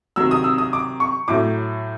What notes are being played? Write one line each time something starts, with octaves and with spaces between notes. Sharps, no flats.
C3 D#3 F#3 E6
D#6
E6
D#6
D6
C#6
A2 F#3 A3 D6